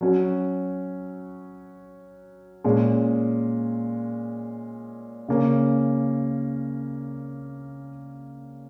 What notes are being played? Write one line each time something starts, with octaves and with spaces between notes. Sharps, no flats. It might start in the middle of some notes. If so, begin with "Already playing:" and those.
F#3 C#4 F#4
A#2 G#3 C#4
C#3 A#3 C#4